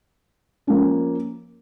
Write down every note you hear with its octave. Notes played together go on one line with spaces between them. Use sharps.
F3 A#3 C#4